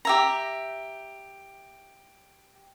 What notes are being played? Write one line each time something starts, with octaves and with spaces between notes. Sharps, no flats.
G4 E5 A#5